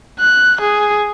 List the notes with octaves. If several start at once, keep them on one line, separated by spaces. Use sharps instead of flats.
F#6
G#4